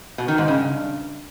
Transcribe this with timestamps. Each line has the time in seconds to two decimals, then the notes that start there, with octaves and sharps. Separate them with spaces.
0.18 B2
0.28 D#3
0.38 G#2
0.48 C#3
0.58 G2